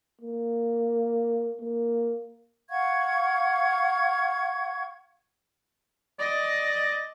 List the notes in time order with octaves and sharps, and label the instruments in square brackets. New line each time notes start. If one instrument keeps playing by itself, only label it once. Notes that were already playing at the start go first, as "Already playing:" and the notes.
[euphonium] A#3
A#3
[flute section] F5 F#5 C#6 G#6
[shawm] D5 [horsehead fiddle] D#5